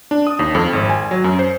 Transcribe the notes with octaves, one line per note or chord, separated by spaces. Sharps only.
D4
D#6
D#2
F2
G#1
G#5
F#3
F#2
C5